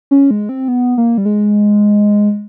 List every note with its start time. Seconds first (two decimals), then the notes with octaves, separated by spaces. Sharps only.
0.11 C#4
0.31 G#3
0.49 C4
0.68 B3
0.98 A#3
1.18 G3
1.25 G#3